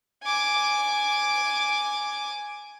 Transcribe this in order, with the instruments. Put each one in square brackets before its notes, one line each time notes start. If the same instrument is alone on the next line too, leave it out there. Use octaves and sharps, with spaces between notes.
[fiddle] G#5 D6